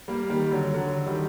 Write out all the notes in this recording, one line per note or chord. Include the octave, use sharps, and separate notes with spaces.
G3 A#3
D#3 G3
D3 F#3
D3 F#3
D#3 G3